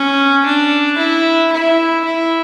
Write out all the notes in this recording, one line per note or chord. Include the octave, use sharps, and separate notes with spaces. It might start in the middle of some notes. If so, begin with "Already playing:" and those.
Already playing: C#4
D4
E4
E4
E4